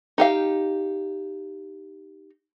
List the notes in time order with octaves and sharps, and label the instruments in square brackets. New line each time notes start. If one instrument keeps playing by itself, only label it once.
[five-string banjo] D#4 G4 F5